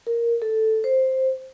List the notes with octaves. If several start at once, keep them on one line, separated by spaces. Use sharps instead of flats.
A#4
A4
C5